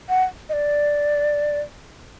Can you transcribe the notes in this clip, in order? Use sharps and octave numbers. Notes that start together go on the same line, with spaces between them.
F#5
D#5
D5